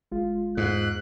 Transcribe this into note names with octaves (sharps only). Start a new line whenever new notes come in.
F#1 G#3 F4
E2 G#2 F#6